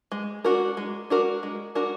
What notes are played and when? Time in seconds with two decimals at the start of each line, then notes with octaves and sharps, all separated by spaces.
0.12 G#3
0.45 D4 F#4 A#4
0.77 G#3
1.10 D4 F#4 A#4
1.43 G#3
1.75 D4 F#4 A#4